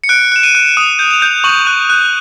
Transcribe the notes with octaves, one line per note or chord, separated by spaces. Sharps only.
C#7
F#6 D7
F#6 E7
D#7
F#6
D#6 E7
G6
F7
G6
C#6 F#7
F#6
F#6